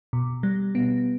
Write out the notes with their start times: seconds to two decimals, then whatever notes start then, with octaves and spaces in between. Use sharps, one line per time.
0.13 B2
0.43 G3
0.75 B3